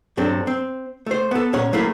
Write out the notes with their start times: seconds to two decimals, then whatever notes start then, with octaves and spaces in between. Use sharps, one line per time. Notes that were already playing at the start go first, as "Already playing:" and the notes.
0.17 G2 F#3 C4 D4 A4
0.47 C4
1.06 A3 C5
1.31 B3 A4
1.53 C2 A#2 C#4 C#5 F#5
1.73 F#3 A3 A#3 E4 G#4